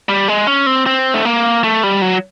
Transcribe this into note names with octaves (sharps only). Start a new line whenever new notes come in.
G3
G#3
C#4
C4
C4
A3
A#3
A3
G3
F#3